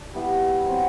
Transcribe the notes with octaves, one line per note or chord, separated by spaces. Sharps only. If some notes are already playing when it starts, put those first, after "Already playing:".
Already playing: D4
G3 B3 E4
F#3 C4 F#4